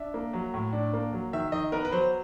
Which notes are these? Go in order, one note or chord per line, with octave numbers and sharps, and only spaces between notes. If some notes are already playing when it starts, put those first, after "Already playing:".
Already playing: D4 E5
A#3
F#3
A2
D4
A#3
F#3
D#3 E5
D#3 D#5
B3 A#4
B4
F#3 C5